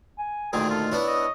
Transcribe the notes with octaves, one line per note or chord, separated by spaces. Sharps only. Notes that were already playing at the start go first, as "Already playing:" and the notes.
G#5
D2 A#2 D#3 G#4 G5
F4 A4
B3 D4 E4 C#5
D#5